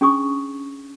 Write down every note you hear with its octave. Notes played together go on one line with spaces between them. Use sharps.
C#4 D4 G#4 A5 C#6 D#6